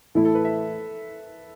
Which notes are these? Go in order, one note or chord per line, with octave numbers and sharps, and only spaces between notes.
A2 E3 A3 E4 A4
A4
B4
E5